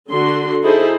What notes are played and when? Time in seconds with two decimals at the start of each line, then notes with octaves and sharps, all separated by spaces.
0.10 D3 F#4 C6
0.64 D#4 E4 G#4 A4 C5